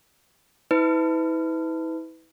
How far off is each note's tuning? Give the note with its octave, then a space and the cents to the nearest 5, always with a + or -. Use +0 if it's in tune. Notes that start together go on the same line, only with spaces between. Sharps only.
E4 -35 B4 +25